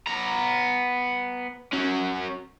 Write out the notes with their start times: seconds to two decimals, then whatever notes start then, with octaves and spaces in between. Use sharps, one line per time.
0.07 B3 A#5
1.73 C#4 F#4